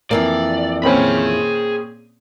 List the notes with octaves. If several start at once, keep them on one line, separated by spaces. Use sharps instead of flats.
F2 E3 A#3 D5
A#2 C4 C#4 G#4 B5